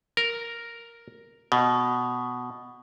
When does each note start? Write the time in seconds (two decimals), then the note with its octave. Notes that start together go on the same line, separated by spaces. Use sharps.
0.17 A#4
1.52 B2